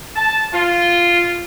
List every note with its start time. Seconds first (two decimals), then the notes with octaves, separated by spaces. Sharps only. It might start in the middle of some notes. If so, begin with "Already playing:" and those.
0.16 A5
0.53 F4